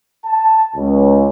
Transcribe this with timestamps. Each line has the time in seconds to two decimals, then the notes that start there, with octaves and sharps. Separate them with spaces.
0.25 A5
0.76 C#2